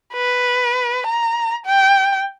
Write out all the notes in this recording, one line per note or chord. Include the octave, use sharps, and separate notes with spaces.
B4
A#5
G5